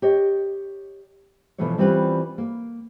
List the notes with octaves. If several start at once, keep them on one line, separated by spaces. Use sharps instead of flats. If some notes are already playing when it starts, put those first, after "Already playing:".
G4 C#5 D#5
B2 E3 F3 A3 D4 C#5
E3 G3 C4 C#4 F4 B4
A#3